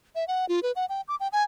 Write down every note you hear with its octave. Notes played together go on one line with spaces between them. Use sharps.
E5
F#5
F4
B4
F#5
G5
D6
G5
G#5